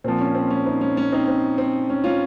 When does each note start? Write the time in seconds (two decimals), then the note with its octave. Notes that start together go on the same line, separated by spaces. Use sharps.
0.04 A#2 F3 C4
0.20 C#4
0.35 C4
0.50 C#4
0.66 C4 D#4
0.81 C#4
0.97 C#4
1.12 C4 D#4
1.28 C4
1.58 C4
1.90 C#4
2.04 C#4 F4